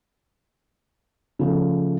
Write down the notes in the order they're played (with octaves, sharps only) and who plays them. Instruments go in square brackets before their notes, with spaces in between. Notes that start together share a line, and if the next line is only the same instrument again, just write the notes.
[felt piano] C#3 F3 A3